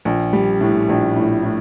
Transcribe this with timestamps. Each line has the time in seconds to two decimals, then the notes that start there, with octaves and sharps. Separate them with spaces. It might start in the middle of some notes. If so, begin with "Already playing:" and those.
0.05 A#1
0.33 G3
0.61 A2
0.89 A#1
1.16 A2
1.43 A2